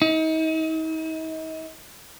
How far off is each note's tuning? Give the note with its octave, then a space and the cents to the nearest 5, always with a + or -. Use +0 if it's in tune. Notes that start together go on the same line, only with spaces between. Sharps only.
D#4 +40